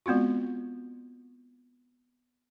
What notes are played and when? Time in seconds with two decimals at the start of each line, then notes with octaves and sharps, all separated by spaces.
0.06 G#3 B3 C4 F4 F#4